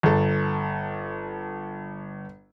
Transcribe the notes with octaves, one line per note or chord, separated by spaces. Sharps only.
G1 A4